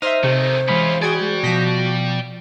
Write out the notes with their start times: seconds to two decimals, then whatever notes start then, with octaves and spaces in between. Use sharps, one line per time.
0.02 D#4 C5 E5 C6 F6
0.24 C3 D#3 A3
0.69 E3 G#3 C#4 F4 B5
1.02 F#4 G#4 D5 G5 G#6
1.43 B2 F3 G6 A#6 B6